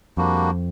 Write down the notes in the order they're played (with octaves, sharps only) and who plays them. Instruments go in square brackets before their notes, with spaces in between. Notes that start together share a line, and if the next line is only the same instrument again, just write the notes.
[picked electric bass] F2 [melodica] G3 A#3 D4 F#4